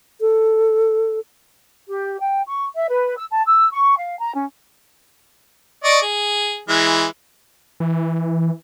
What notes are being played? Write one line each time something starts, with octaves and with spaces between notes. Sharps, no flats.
A4
G4
G5
C#6
E5
B4
E6
A5
E6
C#6
F5
A#5
C#4
D5 D#5 C#6
G#4
E3 G#3
E3